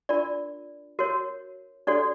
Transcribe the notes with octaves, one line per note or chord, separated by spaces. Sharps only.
D4 F4 A#4 D5
F#4 A#4 C#5
D4 F#4 A4 C#5 D5